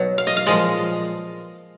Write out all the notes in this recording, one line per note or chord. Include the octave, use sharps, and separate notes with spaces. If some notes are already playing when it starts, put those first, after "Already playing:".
Already playing: B2 F#3
F5
D#5
F5
A#2 F3 G#3 D#5